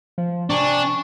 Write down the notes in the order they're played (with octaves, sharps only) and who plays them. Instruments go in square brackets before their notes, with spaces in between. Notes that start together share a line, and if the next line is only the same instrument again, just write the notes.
[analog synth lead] F3
[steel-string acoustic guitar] C3 G#5 [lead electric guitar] D4 [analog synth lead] C#6